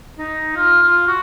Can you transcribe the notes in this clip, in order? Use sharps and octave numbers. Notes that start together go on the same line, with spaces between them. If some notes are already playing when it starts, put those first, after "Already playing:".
D#4
F4
F4
F#4